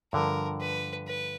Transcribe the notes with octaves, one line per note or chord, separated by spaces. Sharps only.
G2 D3 F3 A#4
B4
B4